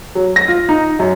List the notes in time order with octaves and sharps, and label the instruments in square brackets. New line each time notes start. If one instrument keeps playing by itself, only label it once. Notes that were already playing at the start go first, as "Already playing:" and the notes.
[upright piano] F#3
A#6
F4
D#4
F#2